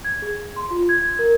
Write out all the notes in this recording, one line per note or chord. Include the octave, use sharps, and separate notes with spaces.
G#6
G#4
C6
F4
G#6
A#4